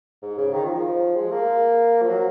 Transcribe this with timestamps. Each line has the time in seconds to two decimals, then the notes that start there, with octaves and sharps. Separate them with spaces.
0.22 G#2
0.38 C#3
0.53 D#3
0.65 F3
0.75 F3
1.16 G#3
1.31 A#3
2.02 F3
2.08 F#3